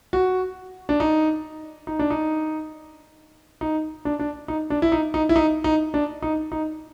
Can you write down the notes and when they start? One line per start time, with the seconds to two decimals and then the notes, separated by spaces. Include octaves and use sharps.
0.13 F#4
0.89 D4
1.00 D#4
1.87 D#4
1.99 D4
2.10 D#4
3.61 D#4
4.05 D4
4.19 D4
4.48 D#4
4.70 D4
4.82 E4
4.92 D#4
5.14 D#4
5.29 E4
5.36 D#4
5.64 D#4
5.94 D4
6.22 D#4
6.52 D#4